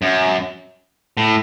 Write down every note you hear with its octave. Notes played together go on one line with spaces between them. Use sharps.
F#2
A2